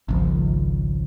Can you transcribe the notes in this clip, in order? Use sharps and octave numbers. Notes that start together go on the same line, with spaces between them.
G#1 C#2 F3